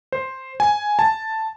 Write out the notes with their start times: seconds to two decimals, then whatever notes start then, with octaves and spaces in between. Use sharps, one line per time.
0.12 C5
0.60 G#5
0.99 A5